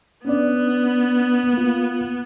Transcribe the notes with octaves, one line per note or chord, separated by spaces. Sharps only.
B3 C#4 D4 D5
A#3 F4